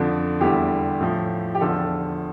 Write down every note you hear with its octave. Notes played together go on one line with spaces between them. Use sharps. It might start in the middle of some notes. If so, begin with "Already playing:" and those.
Already playing: F2 D3 F3 D4
E2 D3 G3 E4 G4
A2 F3
G4
E2 D3 F3 F4 A4